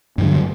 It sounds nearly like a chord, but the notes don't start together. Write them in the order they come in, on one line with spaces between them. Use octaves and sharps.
G2 E3 D3 F#3